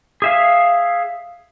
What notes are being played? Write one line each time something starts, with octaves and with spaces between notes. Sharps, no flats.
G#4 E5 F5